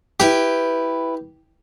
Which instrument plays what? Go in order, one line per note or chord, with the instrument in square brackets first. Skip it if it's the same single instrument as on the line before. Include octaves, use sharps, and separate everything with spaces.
[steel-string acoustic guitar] E4 B4 G5 [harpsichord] G4